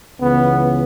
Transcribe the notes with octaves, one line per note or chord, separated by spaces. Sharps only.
C#2 C#3 E3 B3